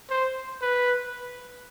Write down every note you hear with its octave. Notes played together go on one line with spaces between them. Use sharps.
C5
B4